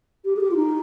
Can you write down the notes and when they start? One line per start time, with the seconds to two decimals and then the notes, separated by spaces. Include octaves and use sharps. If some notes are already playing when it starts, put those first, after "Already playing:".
0.24 G4
0.36 G#4
0.40 G4
0.50 F4
0.55 D#4